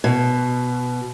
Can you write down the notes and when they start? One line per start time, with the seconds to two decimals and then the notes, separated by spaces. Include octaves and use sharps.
0.04 B2